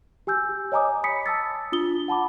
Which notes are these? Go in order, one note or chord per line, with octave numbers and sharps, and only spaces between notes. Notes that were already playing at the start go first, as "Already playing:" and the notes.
G4 G#5 E6 G6
C#5 D#5 G#5 A#5 D6 D#6
B5 D#6 B6 C#7
A5 D#6 E6 A6
D4 F4 D#6 G7
F#5 A5 B5 D6